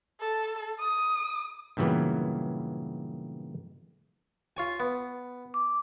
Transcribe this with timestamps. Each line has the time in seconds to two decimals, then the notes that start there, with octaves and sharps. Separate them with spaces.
0.20 A4
0.80 D#6
1.77 G2 A#2 C#3 E3 F#3 B3
4.57 F4 C#5 G#5
4.80 B3
5.54 D6